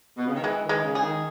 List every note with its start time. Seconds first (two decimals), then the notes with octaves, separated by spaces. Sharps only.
0.17 B2
0.26 C#3
0.35 D#3
0.44 E3 G#3
0.63 D#3
0.69 G#3
0.83 C#3
0.95 G#4
1.02 D#3